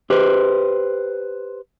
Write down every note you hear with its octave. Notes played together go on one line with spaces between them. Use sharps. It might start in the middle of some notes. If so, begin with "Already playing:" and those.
G4 B4 C5